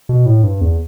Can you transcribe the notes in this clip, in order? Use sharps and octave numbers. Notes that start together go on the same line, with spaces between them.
B2
A2
G2
E2